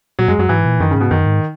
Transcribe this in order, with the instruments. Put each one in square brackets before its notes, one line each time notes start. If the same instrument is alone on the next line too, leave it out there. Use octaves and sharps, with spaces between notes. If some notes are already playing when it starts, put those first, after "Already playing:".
[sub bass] A#2 [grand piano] F#3
[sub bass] F#2 [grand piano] G#3
[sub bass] F#2 [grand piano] F#3
[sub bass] G#2 [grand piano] E3
[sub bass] A#2
[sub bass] F#2 [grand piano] D#3
[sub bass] G#2 [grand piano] C#3
[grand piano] B2
[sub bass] F#2 [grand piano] D#3
[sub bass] G#2